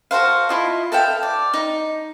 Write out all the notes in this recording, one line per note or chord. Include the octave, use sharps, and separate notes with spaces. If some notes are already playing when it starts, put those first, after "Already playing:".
F#4 A4 C5 F5
E4 F4 D#5
A4 E5 F5 G5
D5
D#4